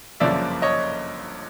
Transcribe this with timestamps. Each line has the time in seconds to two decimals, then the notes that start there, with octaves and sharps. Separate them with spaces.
0.20 G1 F#2 C#3 F3 A#3 D5 E5
0.62 C#5 D#5